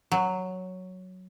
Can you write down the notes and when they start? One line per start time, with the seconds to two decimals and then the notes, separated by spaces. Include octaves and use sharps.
0.12 F#3